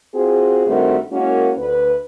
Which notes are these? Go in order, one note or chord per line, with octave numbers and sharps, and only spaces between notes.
C4 F4 F#4 G#4
G2 D#3 A3 C4 F#4 A#4
G#3 A#3 C#4 E4 F#4 A#4
D2 B4